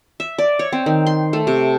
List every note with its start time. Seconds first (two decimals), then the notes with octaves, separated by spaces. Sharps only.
0.20 E5
0.38 D5
0.59 C#5
0.73 C4
0.86 D#3
1.07 C6
1.33 A3
1.47 C3